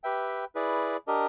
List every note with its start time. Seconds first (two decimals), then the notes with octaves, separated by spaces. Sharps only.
0.04 G4 B4 E5 G5
0.55 E4 G#4 B4 D5
1.07 D4 G4 A#4 D#5